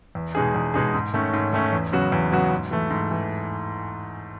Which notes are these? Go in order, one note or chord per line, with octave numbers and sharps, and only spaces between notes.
E2
B2 G#3 D#4 G#4
E2
B2 G#3 D#4 G#4
G#2
D#3 A3 C#4
G#2
D#3 A3 C#4
E2
C#3 F#3 B3 F#4
E2
C#3 F#3 B3 F#4
G#2
E3 A3
G#2
E3